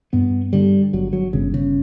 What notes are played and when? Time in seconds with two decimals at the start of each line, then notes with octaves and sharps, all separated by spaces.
0.13 G2 B3
0.53 D3 G3
0.93 G1 F#3
1.13 F#3
1.33 G1 C#3
1.54 C#3